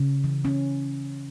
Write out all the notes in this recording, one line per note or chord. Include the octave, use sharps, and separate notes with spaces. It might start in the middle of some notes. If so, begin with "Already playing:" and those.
Already playing: C#3
E3
C#4